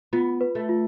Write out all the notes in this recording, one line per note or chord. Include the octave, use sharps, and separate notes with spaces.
B3 F4
B4
A3
F4